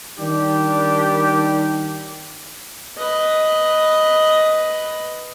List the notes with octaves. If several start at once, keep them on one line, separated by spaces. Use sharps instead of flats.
D#3 G3 D4 G4
B4 D#5